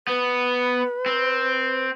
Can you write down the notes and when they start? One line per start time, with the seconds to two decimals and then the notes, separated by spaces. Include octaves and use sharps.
0.07 B3 B4
1.06 C4